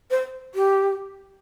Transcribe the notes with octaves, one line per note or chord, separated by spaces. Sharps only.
C5
G4